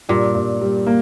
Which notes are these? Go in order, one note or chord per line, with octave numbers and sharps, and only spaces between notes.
G2 A#2
G2
G3
A#3